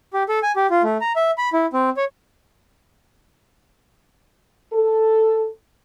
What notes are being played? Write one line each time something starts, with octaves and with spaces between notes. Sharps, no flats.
G4
A4
G#5
G4
F4
A3
A#5
E5
B5
E4
C4
C#5
A4